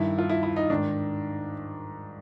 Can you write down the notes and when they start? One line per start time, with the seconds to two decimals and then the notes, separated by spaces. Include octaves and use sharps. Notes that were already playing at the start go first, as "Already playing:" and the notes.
Already playing: G2 D#3 E4
0.18 F4
0.29 E4
0.43 E4
0.56 D#4
0.70 G#2 D#3 D4